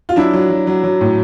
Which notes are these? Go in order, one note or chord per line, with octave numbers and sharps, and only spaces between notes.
F4
F#3 D4 E4
F#3
F#3
F#3
F#3
A2